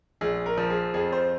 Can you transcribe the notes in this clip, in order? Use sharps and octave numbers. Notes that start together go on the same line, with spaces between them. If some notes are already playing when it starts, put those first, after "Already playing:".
A#1 G#4
A#4
F3
G#4
F2 G#4
C5